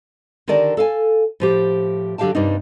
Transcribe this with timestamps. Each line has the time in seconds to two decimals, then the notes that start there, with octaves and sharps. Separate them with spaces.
0.48 D3 D#3 G4 A#4 D5 A5
0.77 A4 F5 G#5
1.40 A2 F3 G4
2.18 D3 F#3 G4 F5 G5 A5
2.35 G2 C3 G3 A#3 D4 D#4